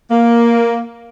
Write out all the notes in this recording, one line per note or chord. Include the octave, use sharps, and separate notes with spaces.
A#3